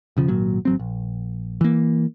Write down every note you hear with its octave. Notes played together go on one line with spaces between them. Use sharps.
E1 C#3 F3
G#1 A#2 F#3
G#1 F#3 C4
A#1
E3 A#3